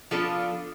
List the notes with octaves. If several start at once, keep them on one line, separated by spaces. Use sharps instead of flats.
F3 B3 D4 F4 A4